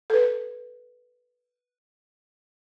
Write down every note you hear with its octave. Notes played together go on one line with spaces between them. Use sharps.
A4 B4